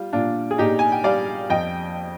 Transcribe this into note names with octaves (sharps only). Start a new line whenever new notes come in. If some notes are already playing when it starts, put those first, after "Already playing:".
Already playing: G3 F4
A#2 D4 F4
G#4
A#2 D#4 G4
G#5
G5
G3 D5 F5
F2 D#5 G5